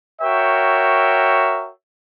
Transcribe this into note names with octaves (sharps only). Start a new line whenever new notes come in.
F#4 A#4 C#5 E5 G5